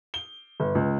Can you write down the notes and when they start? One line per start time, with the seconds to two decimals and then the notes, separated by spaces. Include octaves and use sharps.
0.14 G7
0.60 G1
0.75 C#2